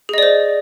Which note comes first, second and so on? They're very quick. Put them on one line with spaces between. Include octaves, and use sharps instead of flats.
G#4 D#5 D5 C5